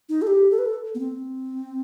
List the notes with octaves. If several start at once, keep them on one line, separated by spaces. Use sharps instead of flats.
D#4
A4
G4
A4
B4
A4
B3
C4